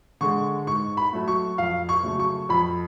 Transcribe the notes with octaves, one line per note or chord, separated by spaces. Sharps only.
D3 G#3 C#6
G#2 C#6
B5
F#3 A3
C#6
F2 F5
C#6
C#3 F#3 A3
C#6
F2 B5